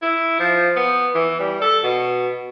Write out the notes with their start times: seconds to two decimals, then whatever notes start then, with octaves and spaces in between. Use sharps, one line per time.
0.03 E4
0.40 F3
0.76 B3
1.15 E3
1.40 G3
1.61 A4
1.83 B2